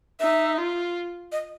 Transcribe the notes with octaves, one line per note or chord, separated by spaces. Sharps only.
D#4 E5
F4
D#5